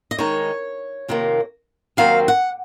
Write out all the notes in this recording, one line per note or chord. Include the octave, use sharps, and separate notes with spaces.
D#5
D#3 G#3 D#4 C#5
F2 C3 D#3 A#3
D#2 D#3 F#3 C4 F5
F#5